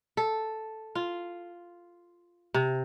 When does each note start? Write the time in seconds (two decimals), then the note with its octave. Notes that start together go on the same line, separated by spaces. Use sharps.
0.17 A4
0.95 F4
2.54 C3